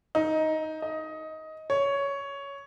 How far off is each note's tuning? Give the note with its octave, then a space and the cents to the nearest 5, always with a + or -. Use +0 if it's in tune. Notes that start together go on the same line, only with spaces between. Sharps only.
D#4 +10
D#5 +15
C#5 +10